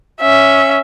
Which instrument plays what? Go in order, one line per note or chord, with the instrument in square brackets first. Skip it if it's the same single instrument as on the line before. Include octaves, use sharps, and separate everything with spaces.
[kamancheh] C#4 E5